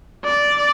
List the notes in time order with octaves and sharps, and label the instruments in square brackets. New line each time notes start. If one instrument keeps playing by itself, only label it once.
[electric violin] D5